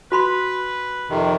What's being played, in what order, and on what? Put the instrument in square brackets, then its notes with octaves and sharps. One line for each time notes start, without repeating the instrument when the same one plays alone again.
[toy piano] F#4 B5 C6 [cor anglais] B4
[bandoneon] F2 C3 D#3